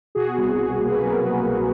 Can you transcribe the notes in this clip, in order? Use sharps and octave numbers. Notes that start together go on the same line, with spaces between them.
B2 F#4 G#4
C2
C2
A#3
B4
F#3 G#4 A#4
F#3
B2